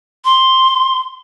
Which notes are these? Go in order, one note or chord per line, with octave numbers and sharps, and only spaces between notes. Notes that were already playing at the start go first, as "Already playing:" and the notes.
C6